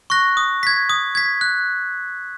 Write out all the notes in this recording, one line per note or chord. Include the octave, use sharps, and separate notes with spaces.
C#6 F#6 A#6
D#6
G#6 B6
D#6
G#6 B6
F#6